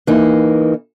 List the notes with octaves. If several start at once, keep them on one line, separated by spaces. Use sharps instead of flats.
E3 A#3 D#4